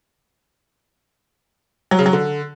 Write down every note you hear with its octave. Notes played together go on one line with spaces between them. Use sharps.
F#3
C#3
F#3
D3